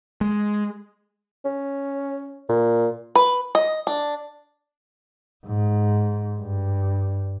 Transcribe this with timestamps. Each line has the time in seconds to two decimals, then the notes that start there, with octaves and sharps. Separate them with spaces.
0.21 G#3
1.45 C#4
2.49 A#2
3.15 B4
3.55 D#5
3.87 D4
5.45 G#2
6.39 G2